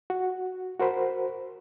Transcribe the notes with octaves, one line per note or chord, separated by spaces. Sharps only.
F#4
F#4 A#4 C5 B5